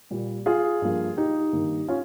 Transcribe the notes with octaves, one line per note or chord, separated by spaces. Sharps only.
A#2 G3 A#3
F4 G#4
G2 F3 A#3
D#4 G4
G2 D#3 A#3
C#4 F4